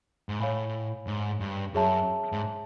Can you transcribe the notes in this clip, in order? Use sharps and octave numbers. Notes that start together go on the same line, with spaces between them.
G#2
A2 C#5 F5 G#5 B5
G#2
G2
F#2 G#4 C#5 E5 A5
G#2